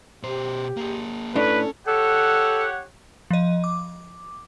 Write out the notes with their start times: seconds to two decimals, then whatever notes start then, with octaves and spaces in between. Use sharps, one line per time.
0.23 B2 G4 C5
0.77 A#3 G#4
1.36 A2 C#4 D4 A4 B4
1.87 G4 A4 C#5 F#5
3.31 F3 D#5
3.64 D6